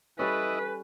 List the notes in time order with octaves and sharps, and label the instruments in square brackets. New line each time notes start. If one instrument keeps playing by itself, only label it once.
[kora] G3 C#4 [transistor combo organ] E4 D#5 [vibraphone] A4 G#5 B5 [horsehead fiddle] B4